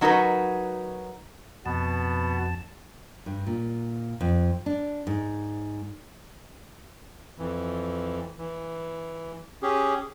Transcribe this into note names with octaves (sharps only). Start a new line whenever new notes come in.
F#3 D#4 F#4 A#4 B4
F2 B2 B3 A5
G2
A#2
F2
D4
G#2
F2 E3
E3
C#4 G4 G#4